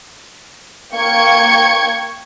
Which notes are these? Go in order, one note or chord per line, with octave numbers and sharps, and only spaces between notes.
A#3 G5 C#6 G#6 C#7